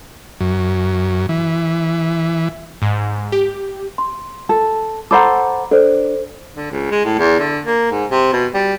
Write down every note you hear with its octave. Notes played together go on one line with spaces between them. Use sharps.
F#2
E3
G#2
G4
C6
A4
A4 C5 F#5 A#5 B5 D6
D4 A4 C5
D3
C#2
G#3
A2
E2
D3
A#3
G#2
C3
B2
G3